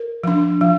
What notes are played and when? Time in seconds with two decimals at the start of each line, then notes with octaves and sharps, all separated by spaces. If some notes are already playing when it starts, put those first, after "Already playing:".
Already playing: A#4
0.24 F3 D4
0.61 F3